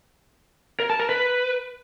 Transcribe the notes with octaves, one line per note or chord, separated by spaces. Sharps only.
A#4
A5
A#4
B4